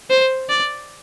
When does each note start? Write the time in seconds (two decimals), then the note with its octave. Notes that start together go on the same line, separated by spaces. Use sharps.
0.10 C5
0.49 D5